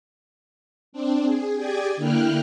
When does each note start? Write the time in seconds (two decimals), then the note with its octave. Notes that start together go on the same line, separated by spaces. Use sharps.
0.93 C4 D4
1.25 G#4
1.56 G4 G#4 D5 G#5
1.97 D3 A#3 E4 G5 F6 F#6